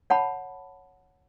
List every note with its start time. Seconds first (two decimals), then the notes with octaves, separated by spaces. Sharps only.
0.10 C#5 F#5 A5 B5